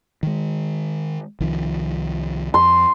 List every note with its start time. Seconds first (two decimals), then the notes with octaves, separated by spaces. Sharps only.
0.23 D#3 G#3
1.40 C2 D#3 F3
2.54 F2 C6